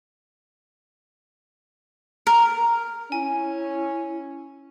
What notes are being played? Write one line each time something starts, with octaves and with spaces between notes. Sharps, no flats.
A#4
C#4 E4 G#5